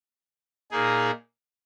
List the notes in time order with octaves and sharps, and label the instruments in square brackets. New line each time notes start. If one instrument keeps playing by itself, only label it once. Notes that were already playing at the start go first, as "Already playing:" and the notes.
[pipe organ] A#2 A#3 D#4 G#4